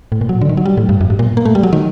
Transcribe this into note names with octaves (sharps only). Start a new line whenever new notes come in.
A2
A#2
F#3
D3
D#3
F#3
G3
A2
G2
F#2
G2
A#2
A#3
A3
G3
F#3
D#3